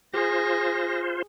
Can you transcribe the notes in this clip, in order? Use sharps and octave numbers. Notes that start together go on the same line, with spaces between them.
F4 G#4 C5 A#6